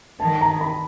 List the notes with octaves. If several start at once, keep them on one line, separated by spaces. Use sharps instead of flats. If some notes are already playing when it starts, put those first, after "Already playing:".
D#3 A5
A#5
B5